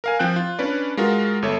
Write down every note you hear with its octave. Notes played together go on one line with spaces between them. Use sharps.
A#4 F5 G#5
F3 C4 G5 F#6
F4
C#4 D4 B4 D5
G#3 F4 F#4 A#4
G1 A4 C#5 E5